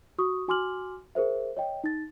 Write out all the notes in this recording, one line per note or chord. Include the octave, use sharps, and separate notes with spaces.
F#4 C#6 D#6
F#4 G#5 C6 D6 F6 F#7
G#4 A#4 C5 E5
C#5 D#5 G5
D#4 A6